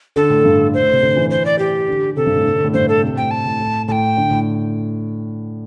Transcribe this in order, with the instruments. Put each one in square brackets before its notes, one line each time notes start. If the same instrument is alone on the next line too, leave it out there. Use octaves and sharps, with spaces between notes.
[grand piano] D3 [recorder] A4
[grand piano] A2
G2
[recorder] C5
[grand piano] A2
C3
D3
E3
[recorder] C5
D5
G4
[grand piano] D3
[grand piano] C3 [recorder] A4
[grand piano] G2
A2
D3
C3
D3
A2
[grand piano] G2 [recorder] C5
[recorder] A4
[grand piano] C3
[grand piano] A2 [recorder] G5
[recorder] A5
[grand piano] A2
A2
[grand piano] A2 [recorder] G5 A5
[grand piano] D3
A2